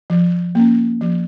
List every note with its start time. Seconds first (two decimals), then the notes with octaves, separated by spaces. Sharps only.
0.10 F3
0.55 A#3 C#4
1.01 F3